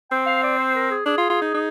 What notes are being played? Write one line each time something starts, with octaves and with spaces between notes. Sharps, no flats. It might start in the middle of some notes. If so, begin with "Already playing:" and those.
C4 G5
F5
D5
C5
A#4
G#4
D4 G#4
F4
F4
D#4
D#4